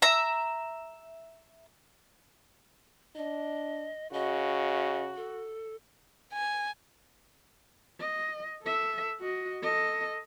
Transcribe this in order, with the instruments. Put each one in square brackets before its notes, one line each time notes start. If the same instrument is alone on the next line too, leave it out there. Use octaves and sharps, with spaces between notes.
[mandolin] E5 A#5
[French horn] D4 [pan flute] D#5
[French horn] C#3 [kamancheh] F#4 [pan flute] D#5
[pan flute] A4
[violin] G#5
[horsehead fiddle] D#5
A4 E5
F#4 D#5
A4 D#5